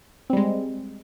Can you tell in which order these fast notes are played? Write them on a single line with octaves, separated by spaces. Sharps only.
C4 G3 G#3